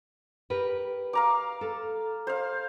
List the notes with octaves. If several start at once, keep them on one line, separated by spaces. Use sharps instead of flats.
G4 A#4 B4
F5 A#5 D6
A4
C5 F5